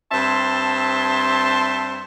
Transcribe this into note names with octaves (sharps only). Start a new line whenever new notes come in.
G2 C4 E5 A5 C6